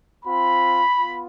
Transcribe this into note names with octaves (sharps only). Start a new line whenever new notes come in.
C4 F4 B5
B3 F4